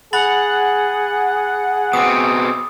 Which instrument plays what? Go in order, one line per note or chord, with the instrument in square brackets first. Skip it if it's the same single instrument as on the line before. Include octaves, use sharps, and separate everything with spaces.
[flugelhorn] G#4 [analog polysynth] F#5 [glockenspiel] B5 A6 F#7
[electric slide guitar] B2 C4 [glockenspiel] D6 D#6